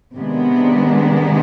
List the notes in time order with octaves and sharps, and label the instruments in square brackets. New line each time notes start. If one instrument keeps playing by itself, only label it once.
[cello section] C3 D#3 G#3 B3 D4